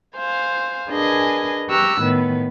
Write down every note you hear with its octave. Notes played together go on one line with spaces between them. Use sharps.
C5 F5 G#5
D4 G#4 A#4 B4 D#5 G#5
G4 A#5 C#6 D6 E6 F#6
A2 D#3 B3 B4